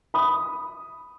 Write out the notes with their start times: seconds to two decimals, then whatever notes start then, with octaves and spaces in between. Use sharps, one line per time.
0.14 B5 D#6